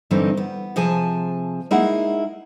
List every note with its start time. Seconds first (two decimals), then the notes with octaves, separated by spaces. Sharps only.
0.11 G2 D3 E3 C4 D#4
0.37 B3
0.76 C3 F3 G#4 G#5 A5
1.71 G#3 A#3 D#4 E4 G#4 F#5